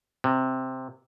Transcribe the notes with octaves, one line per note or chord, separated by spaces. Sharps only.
C3